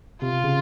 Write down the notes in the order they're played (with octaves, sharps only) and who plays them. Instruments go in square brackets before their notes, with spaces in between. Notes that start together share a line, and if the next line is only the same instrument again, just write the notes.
[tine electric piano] C3 [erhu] F4
[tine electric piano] C#3